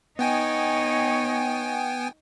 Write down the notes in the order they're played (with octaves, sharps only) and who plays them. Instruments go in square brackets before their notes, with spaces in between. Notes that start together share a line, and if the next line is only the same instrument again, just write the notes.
[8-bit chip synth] B3 G5 G#5 [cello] D#4 C#5